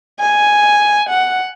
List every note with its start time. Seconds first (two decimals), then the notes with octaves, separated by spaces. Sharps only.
0.19 G#5
1.10 F#5